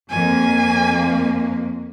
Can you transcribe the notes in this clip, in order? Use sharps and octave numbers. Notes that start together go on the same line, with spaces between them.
F2 A#3 G#5